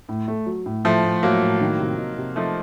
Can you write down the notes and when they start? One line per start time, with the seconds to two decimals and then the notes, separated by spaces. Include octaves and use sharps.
0.09 A2
0.28 A3
0.46 F#3
0.66 A2
0.84 A2 F3 A3
1.04 A2
1.22 A2 F#3 A#3
1.41 A2
1.61 D#3
1.79 C3
1.98 D#4
2.18 C3
2.36 F3 A3 D#4